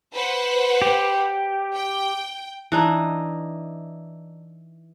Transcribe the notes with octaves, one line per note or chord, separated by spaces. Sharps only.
B4 C5 F#5
G4
G5
E3 D4 D#4